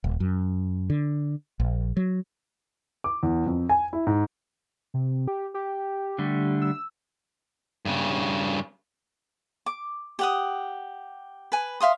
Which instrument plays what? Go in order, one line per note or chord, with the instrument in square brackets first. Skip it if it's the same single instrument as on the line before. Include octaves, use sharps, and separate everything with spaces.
[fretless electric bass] D#1
F#2
D3
A#1
F#3
[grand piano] D6
E2
F2
G#5
E4
G#2
[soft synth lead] C3
G4
G4
[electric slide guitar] D3 G3 A3
[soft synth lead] E6
[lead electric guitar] G2 C#3
[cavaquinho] D6
G4 F#5 D#6
B4 G#5
E5 F5 C6 D#6